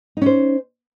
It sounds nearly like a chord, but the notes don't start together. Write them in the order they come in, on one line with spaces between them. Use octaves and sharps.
D#4 C#4 C5